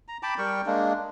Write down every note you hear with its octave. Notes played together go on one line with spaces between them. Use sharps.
A#5
G5 A5 B5 D6
G3 A#4 G5 C#6
G#3 A#3 D4